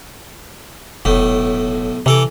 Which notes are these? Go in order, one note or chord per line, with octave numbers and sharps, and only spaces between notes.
F1 B1 A2 A3
C3 E3 A4 D6